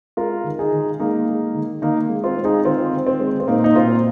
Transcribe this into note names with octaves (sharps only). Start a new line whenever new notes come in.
G#3 F4 A#4
D#3
D#4 G#4
D#3
G#3 A#3 D#4
G#3
D#3
D#3 A#3 D#4
G#3
C4 F4
G#3
D#4 G#4
D#3 C4 F4
D#3
C4
G#3
C4
A#2 A#3 D#4
D#4
A#2 C4 F4